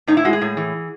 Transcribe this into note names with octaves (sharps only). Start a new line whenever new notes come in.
A2 D#4
E4
G#3 F#4
G#4
A2
E3